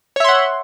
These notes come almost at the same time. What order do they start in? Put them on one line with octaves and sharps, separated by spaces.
C#5 E5 C6 F#5